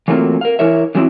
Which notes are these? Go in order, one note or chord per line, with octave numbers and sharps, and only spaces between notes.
E3 F#3 A3 A#3 C4 F4
A#4 F5
E3 E4 A#4 C#5 E5
D3 E3 F#3 G#3 C4 E4